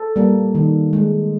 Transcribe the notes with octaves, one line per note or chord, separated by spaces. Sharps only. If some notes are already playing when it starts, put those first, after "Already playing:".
Already playing: A4
G3 A#3
D#3
G#3